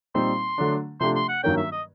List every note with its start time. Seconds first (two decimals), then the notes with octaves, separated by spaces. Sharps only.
0.15 A#2 G3 C4 D#4 C6
0.58 D3 F#3 A3 D4
1.00 C3 F3 A3 D4 G4 C6
1.15 C6
1.29 F#5
1.43 G2 D#3 F#3 A#3 C#4 G5
1.57 E5
1.72 D#5